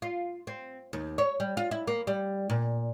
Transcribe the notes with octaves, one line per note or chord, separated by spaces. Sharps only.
F4
C4
D#2
C#5
G3
F4
E4
A#3
G3
A#2